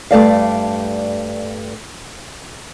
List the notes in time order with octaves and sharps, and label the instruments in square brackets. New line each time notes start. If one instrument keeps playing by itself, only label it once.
[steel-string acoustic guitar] G2 A3 D5 F5